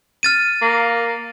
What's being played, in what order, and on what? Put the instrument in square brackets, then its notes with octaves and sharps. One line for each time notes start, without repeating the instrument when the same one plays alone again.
[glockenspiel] F6 A6 D#7
[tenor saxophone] A#3